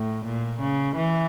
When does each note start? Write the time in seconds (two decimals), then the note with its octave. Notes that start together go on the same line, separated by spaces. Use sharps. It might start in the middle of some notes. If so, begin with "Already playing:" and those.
Already playing: A2
0.25 A#2
0.60 C#3
0.96 E3